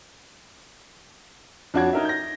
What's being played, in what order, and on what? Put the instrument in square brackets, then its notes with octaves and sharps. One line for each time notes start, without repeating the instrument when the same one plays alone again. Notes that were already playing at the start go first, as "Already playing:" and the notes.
[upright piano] F2 D4 F#4 C#5 D5 G#6
D#4 A#4 E5
G6 A#6